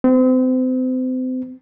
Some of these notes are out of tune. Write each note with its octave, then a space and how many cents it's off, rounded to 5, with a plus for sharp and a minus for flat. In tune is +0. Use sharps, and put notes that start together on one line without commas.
C4 -35